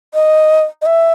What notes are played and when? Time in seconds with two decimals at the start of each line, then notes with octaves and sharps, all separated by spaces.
0.14 D#5
0.82 D#5
0.86 E5